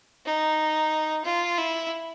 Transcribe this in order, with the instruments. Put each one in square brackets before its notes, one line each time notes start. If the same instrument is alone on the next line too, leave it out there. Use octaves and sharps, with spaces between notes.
[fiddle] D#4
F4
E4